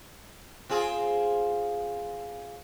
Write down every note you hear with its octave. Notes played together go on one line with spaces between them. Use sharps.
C4 F4 G#4